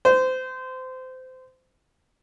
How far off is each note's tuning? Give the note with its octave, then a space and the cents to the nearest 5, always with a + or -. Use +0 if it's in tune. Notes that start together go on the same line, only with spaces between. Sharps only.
C5 -25